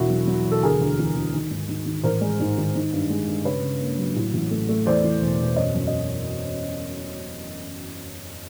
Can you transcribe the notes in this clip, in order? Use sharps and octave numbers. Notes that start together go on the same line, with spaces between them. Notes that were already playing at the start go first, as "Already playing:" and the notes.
Already playing: E1 E4 F#4
F#3
F#3
E1
A4
D2 G#4 A#4
D2
E3
D2
D#3
G#2
D#3
D#3
A1 A#4 C5
G#3
G#2
D#3
D#3
G2
G#3
G2
C#3 B4 C#5
C#3
A#3
F#3
A2
A1
A3
A3
E2 C5 D5
E3
E1
E1
F#2 C#5 D#5
F#2
D#5